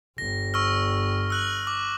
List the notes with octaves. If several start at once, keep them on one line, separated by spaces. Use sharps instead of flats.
G1 G2 A#6
C#6 E6 F6
E6 F#6 F#7
D6